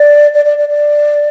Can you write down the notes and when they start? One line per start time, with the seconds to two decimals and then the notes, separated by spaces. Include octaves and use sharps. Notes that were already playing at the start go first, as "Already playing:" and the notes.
Already playing: D5
0.34 D5
0.45 D5
0.58 D5
0.69 D5